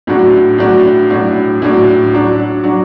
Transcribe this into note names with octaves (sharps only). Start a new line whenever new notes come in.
A2 F#3 D4 F#4
A2 F#3 D4 F#4
A2 F#3 D4 F#4
A2 F#3 D4 F#4
F#3 D4 F#4
F#3 D4 F#4